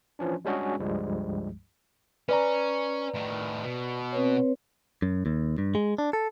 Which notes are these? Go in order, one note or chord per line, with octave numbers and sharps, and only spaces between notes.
E3 F3 C#4 D4
G3 G#3 C#4 D4 F#4 G#4
C#2 G2 F3 G3 G#3
C#4 B4 D5 A#5
A2 D#3
B2
C4 B4 C#5
F#2
D#2
G2
G#3
D4
A4